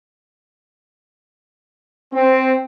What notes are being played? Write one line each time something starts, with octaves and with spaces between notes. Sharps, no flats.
C4